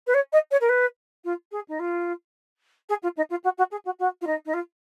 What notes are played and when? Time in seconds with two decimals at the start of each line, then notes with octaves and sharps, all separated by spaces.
0.07 B4
0.14 C#5
0.32 D#5
0.51 C#5
0.60 A#4
0.69 B4
1.24 F4
1.51 G#4
1.68 D#4
1.79 F4
2.89 G#4
3.02 F4
3.16 D#4
3.30 F4
3.44 F#4
3.58 F#4
3.71 G#4
3.85 F#4
3.99 F#4
4.21 F4
4.26 D#4
4.45 D#4
4.53 F4